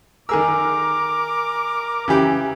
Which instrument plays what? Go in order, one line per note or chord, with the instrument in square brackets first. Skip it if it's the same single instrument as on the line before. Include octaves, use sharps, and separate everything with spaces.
[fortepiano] D#3 G#4 E6 [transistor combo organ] A#4 [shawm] D6
[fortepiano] C#3 E3 G4